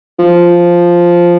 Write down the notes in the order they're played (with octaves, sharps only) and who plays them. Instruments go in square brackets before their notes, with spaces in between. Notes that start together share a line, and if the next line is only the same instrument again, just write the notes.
[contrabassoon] F3